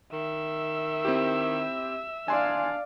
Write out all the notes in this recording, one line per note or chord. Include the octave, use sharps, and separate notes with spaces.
D#3 E5 E6
C4 E4 G4
D4 D5 F5 G#5 C6